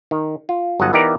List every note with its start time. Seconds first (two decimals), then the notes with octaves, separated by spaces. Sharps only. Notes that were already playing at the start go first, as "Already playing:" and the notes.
0.11 D#3
0.49 F4
0.80 G1 F#3 D#4 D#5 F#5 A5
0.93 E3 B3 D#4 G4 A#4 D5